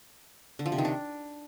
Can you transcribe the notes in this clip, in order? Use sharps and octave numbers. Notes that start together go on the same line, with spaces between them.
D3
F3
C3
D#3
D4